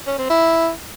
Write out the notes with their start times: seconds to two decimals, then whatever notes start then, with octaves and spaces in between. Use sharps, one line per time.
0.07 C#4
0.18 C4
0.29 E4